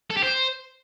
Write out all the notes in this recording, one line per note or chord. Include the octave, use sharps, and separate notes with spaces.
A4
G4
C5